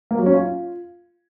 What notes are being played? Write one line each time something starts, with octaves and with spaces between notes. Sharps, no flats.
A#3
F#3
C#4
F4